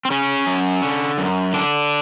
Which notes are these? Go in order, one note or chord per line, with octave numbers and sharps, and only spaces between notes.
C4
C#3 C#4
F#2
D3
F#2
D3 D4